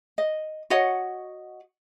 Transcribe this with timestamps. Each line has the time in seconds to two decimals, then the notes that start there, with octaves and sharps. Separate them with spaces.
0.18 D#5
0.70 F#4 C#5 D#5 F#5